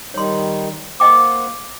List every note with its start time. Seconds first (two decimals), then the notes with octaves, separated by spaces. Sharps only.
0.14 D#3 G3 D#4 C#5 C6
1.00 A#3 C5 D#5 F#5 G5 D6